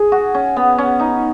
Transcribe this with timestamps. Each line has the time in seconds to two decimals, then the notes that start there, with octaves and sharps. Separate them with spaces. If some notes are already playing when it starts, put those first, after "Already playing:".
Already playing: G#4
0.12 F#4
0.34 C#4
0.57 B3
0.78 C#4
1.00 D#4